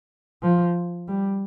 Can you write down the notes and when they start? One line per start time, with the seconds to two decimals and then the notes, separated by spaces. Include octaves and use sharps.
0.43 F3
1.08 G3